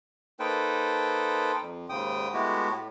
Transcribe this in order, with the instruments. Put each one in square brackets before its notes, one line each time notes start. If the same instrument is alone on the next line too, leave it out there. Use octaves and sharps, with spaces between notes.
[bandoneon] A#3 D#4 A4 B4 C5 G5
F2
D#2 G#2 C#3 G5 D#6
G#3 A3 B3 E4 F#4 G4
A2